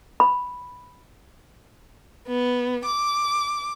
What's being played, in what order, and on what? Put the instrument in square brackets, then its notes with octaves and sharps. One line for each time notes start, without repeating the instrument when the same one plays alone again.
[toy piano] B5
[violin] B3
D6